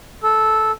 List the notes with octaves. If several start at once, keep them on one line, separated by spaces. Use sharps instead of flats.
A4